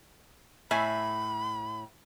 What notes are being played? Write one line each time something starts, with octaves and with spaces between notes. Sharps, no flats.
A2 E5 G#5 B5